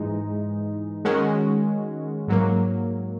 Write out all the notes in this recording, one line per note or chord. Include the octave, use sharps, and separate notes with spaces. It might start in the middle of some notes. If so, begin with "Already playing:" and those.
Already playing: G#2 E3 G#3 D#4
D#3 G#3 C#4 F#4
G#2 F#3 A#3